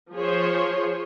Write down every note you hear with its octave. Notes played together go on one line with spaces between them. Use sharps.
F3 G#4 C5 C#5